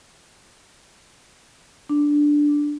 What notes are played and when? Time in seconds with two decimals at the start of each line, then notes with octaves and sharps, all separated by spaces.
1.89 D4